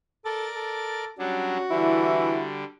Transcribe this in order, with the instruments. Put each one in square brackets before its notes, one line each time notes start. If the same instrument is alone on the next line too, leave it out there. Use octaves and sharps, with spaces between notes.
[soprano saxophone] A4 [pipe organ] A#4 D5 A6
[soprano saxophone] A4
[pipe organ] F#3 G3 D4 [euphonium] C#4 [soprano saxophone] F#4
[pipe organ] D3 G3 [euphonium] E3 [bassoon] E4